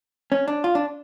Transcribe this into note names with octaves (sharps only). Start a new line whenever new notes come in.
C#4
D4
F4
D4